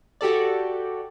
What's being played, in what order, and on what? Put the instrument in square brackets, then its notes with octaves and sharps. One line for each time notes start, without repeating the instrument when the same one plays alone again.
[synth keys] F#4 G4 A4 D5